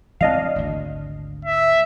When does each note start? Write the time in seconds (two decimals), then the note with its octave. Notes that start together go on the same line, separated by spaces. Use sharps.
0.21 E3 G#3 C4 D4 D#5 F5
0.56 G#1 D2
1.45 E5